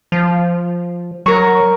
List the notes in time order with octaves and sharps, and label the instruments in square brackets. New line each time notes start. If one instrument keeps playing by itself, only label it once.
[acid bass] F3
[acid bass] F#3 [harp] A#4 C#6